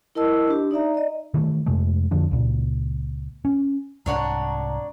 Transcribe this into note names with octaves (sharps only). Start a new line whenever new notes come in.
E4 A#4 D#5 A5 E6
D4 G4
D#4 D5 E5 A#5
D5 D#5
D#3 E3 G3 A3
F2 C3 G#3 A3
F2 D3 F3 D4
C#2 A#2
C#4
C2 G#2 D4 C#5 F#5 A#5